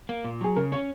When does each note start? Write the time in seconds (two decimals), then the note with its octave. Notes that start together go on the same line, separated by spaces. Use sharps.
0.09 A#3
0.25 A#2
0.41 F#3 G#4
0.56 C#3 A#4
0.72 C#4 C#5